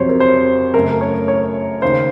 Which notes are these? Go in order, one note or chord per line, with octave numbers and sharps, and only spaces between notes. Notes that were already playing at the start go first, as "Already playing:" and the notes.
Already playing: F2 C3 F#3 C5 C#5
A#4
C5
F#2 C#3 A3 A#4
C#5
C#5
D#2 C#3 C5